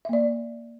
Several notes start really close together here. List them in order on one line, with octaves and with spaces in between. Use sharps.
E5 A#3 D5